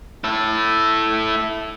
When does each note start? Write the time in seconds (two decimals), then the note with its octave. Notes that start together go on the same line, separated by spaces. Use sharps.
0.24 E4 A4